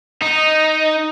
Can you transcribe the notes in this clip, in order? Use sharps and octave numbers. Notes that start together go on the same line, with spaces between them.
D#4